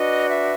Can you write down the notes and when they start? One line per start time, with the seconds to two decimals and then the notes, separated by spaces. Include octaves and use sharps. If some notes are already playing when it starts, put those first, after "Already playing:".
Already playing: D4 F#4 B4 D#5
0.29 E5